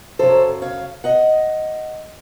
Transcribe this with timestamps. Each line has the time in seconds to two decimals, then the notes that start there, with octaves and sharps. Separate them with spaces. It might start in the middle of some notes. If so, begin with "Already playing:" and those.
0.19 F#2 C#3 F#3 A4 C5
0.62 C#5 F5
1.04 D#5 F#5